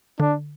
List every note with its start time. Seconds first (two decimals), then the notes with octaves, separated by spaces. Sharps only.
0.20 D3 D4